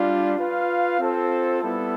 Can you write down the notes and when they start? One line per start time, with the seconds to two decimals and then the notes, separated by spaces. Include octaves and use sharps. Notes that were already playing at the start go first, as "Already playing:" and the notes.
Already playing: G3 D4 F4
0.38 F4 B4 F5
1.00 C4 F4 A4 C5
1.62 G3 B3 E4 A4